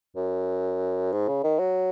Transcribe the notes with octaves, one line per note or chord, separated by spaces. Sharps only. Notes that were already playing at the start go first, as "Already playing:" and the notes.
F#2
G#2
C#3
D#3
F#3